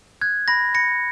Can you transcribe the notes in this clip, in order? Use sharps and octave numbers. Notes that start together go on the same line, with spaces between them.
F#6 G#6
B5 A#6
B5 A#6 C#7